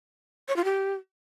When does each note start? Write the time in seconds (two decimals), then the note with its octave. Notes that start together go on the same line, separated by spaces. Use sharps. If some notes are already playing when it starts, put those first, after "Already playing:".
0.48 C#5
0.56 F4
0.64 G4